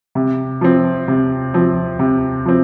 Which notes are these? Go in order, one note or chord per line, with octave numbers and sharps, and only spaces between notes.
C3
F3 C4
C3
F3 C4
C3
F3 C4